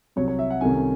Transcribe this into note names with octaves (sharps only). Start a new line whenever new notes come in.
C2 C3 F#3 C#5
C#5
E5
F#5
C2 C3 D#3 A3 C#4 G#5